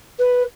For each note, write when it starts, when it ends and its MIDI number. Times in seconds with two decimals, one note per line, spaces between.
0.19 0.43 71